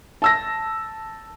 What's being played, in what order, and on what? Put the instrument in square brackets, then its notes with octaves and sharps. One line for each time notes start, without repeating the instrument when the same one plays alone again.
[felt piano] A5 E6 A#6